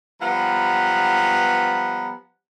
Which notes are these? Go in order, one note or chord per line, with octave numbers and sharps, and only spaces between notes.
F3 G3 B3 F#5 A#5 B5